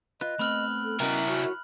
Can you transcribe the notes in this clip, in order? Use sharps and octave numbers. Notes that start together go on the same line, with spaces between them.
F4 B4 D#5 F#6
A3 B3 C4 B5 F6 F#7
A4
B3 C#4 E4 F#4 A#4 D#5
F#4 C#5